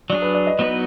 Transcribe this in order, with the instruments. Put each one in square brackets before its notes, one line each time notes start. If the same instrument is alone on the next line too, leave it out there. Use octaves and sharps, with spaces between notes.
[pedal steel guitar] F#3 D4 G#4 [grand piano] D5
[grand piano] B4
D5
D#5
[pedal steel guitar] F#3 B3 D#4 F#4 B4